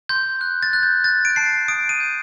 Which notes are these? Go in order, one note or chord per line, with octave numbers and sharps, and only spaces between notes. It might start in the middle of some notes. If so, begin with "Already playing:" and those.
C6 G6
F#6
A6
F#6
G6
F#6 A6
D7
A5 C7
D#6 D7
D#7
G6